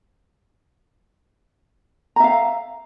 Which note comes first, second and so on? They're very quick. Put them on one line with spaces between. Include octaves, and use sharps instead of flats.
A#5 E5 F5